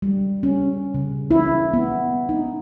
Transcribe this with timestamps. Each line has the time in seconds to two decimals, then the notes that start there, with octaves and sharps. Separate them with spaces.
0.02 G3
0.43 C#4
0.94 C#3
1.31 E4
1.74 B3
2.29 D#4